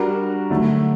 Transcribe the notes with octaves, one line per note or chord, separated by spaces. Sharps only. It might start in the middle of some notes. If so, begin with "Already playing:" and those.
Already playing: G3 D4 F#4 A#4
D3 F#3 A3